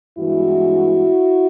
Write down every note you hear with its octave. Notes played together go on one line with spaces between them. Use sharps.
G2 E3 G#3 B3 E4 F#4